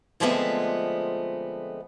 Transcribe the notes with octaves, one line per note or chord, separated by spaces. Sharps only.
D3 F3 G#3 A3 B3 C4